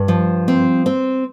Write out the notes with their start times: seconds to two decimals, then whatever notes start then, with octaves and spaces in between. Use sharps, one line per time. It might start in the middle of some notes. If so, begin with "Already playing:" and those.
Already playing: G2
0.08 F3
0.48 C4
0.86 C4